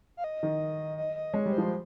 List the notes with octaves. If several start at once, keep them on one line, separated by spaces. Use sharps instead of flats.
F5
D#5
D#3
D#5
D#5
G#3 C#5
G3
C5
F3